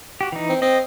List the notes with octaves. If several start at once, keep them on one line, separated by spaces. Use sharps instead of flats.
F#4 G4
E3 D#4
C4
C4 D#5